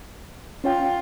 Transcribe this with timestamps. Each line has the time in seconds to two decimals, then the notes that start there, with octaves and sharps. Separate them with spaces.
0.64 C#4 F4 C#5 G5